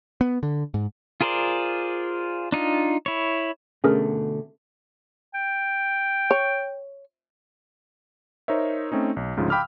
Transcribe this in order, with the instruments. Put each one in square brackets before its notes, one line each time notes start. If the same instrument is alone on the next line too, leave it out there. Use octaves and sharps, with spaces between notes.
[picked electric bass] B3
D3
G#2
[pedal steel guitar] F4 G#4 A#4 C5 D5
D4 D#4 F4
E4 C#5
[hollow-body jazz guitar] B2 D3 A3 [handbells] C#4 G#4 A#4
[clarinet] G5
[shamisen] C#5
[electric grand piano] D#4 A#4 C5 C#5 E5
A3 C4 C#4 D#4
B1
D2 G#2 C#3 F3
F5 G5 B5 D6 E6 F6